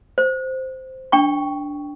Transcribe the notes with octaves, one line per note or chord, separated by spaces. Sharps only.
C5
D4 G5 C#6